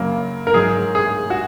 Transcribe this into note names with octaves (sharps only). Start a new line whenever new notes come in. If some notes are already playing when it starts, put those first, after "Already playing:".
Already playing: F#2 C#3 F#3 A#3
A#4
G#2 F#3 G#4
G#4
F#4